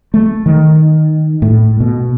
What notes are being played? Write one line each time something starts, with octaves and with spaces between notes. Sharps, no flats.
A3
D#3
A2
B2